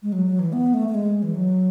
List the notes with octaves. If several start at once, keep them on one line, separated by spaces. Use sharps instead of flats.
G#3
F#3
F#3
E3
B3
A3
A3
G#3
E3
F#3